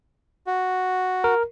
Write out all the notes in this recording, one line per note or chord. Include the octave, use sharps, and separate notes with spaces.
F#4
A#4